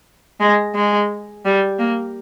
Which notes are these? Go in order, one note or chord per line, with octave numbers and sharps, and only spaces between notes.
G#3
G#3
G3
A#3